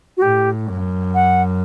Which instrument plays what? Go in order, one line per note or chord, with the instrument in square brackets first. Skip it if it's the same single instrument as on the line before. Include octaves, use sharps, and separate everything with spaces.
[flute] F#4
[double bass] A2 [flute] G4
[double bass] F#2
[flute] F#5